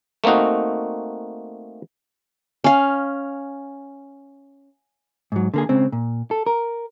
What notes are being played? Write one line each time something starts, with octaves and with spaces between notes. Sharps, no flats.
A3 A#3 C4 D#4 F#4
C#4 F5
G#2 F#3
D3 A#3 G#4
C#3 G#3 C4
A#2
A4
A#4